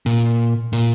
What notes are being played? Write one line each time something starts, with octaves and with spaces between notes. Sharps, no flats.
A#2
A#2